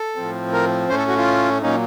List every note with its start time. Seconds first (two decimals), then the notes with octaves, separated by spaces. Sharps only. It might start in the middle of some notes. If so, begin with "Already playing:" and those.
Already playing: A4
0.16 A2 F3 C4
0.53 A#4
0.89 A2 A3 C#4 C5
0.98 A4
1.08 F#4
1.17 F4
1.61 A#2 F#3 A#3 C#4 D#4